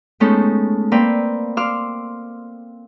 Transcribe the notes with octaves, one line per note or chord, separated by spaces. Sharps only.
G#3 A3 B3 C#4 D#4 A4
A#3 C4 B4 D5 F5 G5
F5 C6 D6 E6 F6